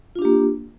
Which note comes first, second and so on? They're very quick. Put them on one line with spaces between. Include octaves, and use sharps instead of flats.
F4 D4 G4 A#3